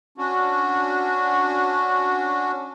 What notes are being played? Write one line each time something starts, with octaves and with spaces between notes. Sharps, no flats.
C#4 D4 F#4